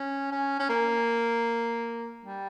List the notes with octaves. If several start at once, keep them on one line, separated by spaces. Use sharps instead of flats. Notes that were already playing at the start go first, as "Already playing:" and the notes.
Already playing: C#4
C#4
C#4
A#3
G3